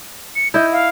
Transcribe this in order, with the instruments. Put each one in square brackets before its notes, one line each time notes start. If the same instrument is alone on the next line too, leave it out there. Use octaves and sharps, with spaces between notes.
[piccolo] C#7
[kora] E4 D#5 [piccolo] G6
[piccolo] F5